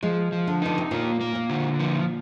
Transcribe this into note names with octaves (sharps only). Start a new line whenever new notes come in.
F3 G#3
F3
D3
D3 D#4
C3
A#2 A#3
A#3
A#2
D3
F3